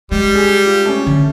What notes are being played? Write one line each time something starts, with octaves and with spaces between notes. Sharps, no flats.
G3 G#3
G#4
F4
A3 C#4
D3